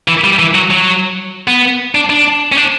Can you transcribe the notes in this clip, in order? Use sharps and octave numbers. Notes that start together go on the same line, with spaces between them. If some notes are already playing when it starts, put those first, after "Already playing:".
E3
G3
E3
F#3
F#3
B3
D4
D4
C#4
D4